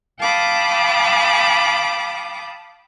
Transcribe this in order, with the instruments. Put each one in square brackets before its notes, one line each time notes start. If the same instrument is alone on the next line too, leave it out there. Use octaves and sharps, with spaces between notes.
[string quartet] F5 G5 A5 B5 D6 D#6